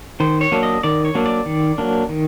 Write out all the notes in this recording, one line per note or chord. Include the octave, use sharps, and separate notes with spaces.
D#3 C5
C#5
F#3 A#3 D4
D#5
D#3 D5
C#5
F#3 A#3 D4
D5
D#3
F#3 A#3 D4
D#3